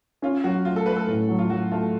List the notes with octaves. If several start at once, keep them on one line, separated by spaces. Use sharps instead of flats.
C#4 F4
F#3 F#4
A3 F4
A4
A3 B4
A4
A2
F#3
F4
F#3 F#4
A3 F4